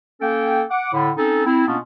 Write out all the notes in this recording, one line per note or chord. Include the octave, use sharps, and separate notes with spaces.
A#3 C#4 A4 G5
F#5 D6
A2 D3
C4 C#4 D#4 A4
C4 E4
B2 A#3 B3 C#4 D4 F4